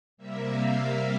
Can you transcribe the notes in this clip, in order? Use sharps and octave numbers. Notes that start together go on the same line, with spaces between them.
C3 G3 A#3 E5
F5